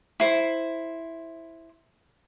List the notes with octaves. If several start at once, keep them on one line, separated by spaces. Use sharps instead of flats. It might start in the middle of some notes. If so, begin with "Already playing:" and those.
E4 C5